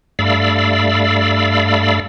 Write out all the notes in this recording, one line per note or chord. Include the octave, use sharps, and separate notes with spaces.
G2 A3 D5 F5 B5 E6